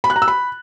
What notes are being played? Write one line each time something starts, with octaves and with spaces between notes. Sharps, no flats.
B5
F#6
A#5
E6
B5